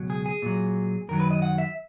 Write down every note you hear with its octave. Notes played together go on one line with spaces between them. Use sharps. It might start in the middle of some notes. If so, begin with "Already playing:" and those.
Already playing: C#2 B2 F#3
G#4
G#4
A#2 F#3
F#2 D#3 F#3 A#4
B4
D#5
F#5
E5